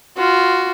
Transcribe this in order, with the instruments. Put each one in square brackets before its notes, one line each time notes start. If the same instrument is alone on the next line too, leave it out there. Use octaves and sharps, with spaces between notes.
[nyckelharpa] F4 [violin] F#4